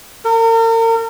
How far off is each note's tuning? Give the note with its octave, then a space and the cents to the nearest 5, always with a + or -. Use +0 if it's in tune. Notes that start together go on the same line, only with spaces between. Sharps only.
A#4 -40